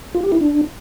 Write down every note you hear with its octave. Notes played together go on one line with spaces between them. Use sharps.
F4
G4
E4
D4